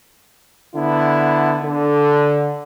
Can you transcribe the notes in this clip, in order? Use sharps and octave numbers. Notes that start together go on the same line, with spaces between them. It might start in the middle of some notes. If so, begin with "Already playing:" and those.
D3 B3 E4
D3